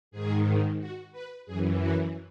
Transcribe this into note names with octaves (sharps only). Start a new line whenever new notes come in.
G#2 D#3 G#4
F#4
B4
F#2 E3 G#4
F#4